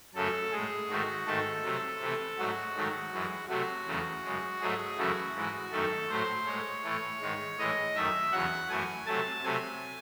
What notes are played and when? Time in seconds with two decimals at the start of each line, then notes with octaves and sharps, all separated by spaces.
0.15 F#2 C#3 F#3 A3 A4
0.52 A2 G#3 G#4
0.89 G#2 D#3 A3 F#4
1.26 G#2 D#3 A3 A4
1.64 C3 F#3 A3
2.00 C3 E3 A3
2.37 G#2 F#3 A3 F#4
2.76 G#2 D#3 F#3 A3
3.13 F#2 E3 G#3
3.49 C3 F#3 A3 F#4
3.87 E2 C#3 F#3 A3
4.24 F#2 C#3 G#3
4.61 G#2 F#3 A3 G#4
4.98 F#2 C#3 E3 A3 F#4
5.34 G#2 E3 G#3
5.72 F#2 D#3 A3 A4
6.09 A2 F#3 A3 C5
6.46 A2 G#3 C#5
6.84 A2 E3 A3
7.21 G#2 D#3 G#3
7.58 A2 E3 G#3 D#5
7.95 F#2 D#3 A3 E5
8.32 E2 C#3 F#3 F#5
8.69 F#2 E3 A3 G#5
9.06 C3 F#3 A3 A5
9.44 C3 F#3 A3 G#5